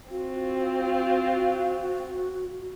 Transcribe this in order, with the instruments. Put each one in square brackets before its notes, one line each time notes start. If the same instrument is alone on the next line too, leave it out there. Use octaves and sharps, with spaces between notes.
[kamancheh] C4 F4 [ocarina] F#4